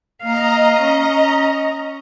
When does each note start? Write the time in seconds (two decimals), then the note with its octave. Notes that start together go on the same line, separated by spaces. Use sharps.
0.23 A#3 D#5 F5 A#5
0.79 C#4